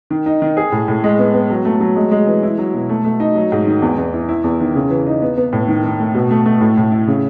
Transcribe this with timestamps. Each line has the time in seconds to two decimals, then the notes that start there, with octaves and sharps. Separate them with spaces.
0.10 D#3
0.26 D#4
0.42 D#3
0.57 G#4
0.72 A2
0.88 A2
1.04 G#3
1.19 B3
1.34 B3
1.50 F#3
1.65 A3
1.80 F#3
1.96 G#3
2.11 G#3
2.27 E3
2.43 E4
2.58 F#3
2.74 B2
2.89 A3
3.05 A3
3.20 D#4
3.35 F#3
3.52 G#2
3.67 D#3
3.82 E2
3.98 E2
4.13 E4
4.29 E4
4.44 E2
4.60 D#3
4.75 C#3
4.90 E3
5.07 D#4
5.22 B3
5.37 B3
5.52 A2
5.68 D#3
5.84 D#3
6.00 A3
6.14 B2
6.31 A3
6.46 A3
6.61 A2
6.77 A2
6.92 E4
7.08 C#3